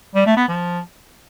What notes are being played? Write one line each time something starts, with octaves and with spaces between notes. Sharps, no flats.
G3
A3
B3
F3